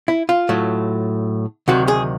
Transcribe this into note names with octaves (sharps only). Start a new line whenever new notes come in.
E4
F4
A2 F#3 A3
D2 C3 D#3 F#3 F#4
G#4